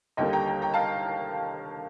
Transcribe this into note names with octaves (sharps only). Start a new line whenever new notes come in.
D#2 D3 G3 A#3 D#5 G5
G5 A#5
G5 A#5
G5 A#5
F5 A5